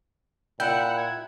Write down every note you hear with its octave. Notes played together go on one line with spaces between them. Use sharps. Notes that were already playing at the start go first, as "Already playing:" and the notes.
A#2 E4 F#5 G5
G#6